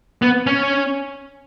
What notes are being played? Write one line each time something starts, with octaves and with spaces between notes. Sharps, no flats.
B3
C#4